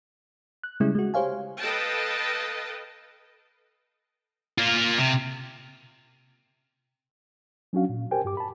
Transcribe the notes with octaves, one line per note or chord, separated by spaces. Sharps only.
F#6
C#3 G3 G#3 C#4 E4
G#3 F#4
G4 C5 C#5 F5 G#5
A4 B4 D#5 F5 G5 A5
A#3 F4
C3
F#3 C#4 D4 F#4 F5
A#2
G4 A#4 C5 G5 G#5
G2 G4 D6
A5 B5